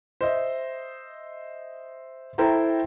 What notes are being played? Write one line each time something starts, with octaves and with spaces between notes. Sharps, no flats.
C5 D#5 E5
E4 A4 C5 G5 A#5